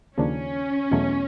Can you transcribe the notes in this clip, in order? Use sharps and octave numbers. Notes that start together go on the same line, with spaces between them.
D#2 C#3 F3 A#3 C#4 D4
E2 B2 F#3 A3